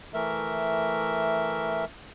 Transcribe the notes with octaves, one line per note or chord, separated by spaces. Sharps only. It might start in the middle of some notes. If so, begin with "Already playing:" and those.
E3 A3 A#4 E5